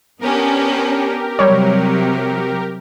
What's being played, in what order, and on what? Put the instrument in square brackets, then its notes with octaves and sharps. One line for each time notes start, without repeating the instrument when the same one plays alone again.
[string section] B3 C#4 D4 [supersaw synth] G4 A#4
[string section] C3 F#3 [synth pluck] G3 C#5